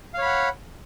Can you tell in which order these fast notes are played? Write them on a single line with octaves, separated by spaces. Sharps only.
F5 C#5 B5 F#5